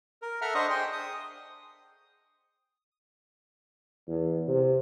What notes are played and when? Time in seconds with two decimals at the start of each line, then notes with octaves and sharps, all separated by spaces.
0.22 A#4
0.41 A4 E5 F#5 A#5 F6
0.54 D4 C5 D#5 C#6 D#6
0.70 G#4 C5 G5 C6
0.92 D#6
4.08 E2
4.48 C3